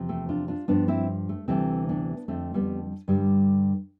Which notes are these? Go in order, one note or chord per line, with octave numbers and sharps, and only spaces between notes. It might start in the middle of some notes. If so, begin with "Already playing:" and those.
Already playing: E2 C3 F3
A3 C4
D4 F4
D4 F4
G2 F3 B3 D4
C4 E4
A3
D2 C3 E3 G3 A3 C4
B3 D4
F2 D3 F3 A3 C4
G3 B3
G2 D3 G3